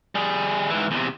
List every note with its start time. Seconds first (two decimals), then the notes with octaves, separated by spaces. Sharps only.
0.15 G3 G#4
0.69 G#2 E3
0.91 E2 C3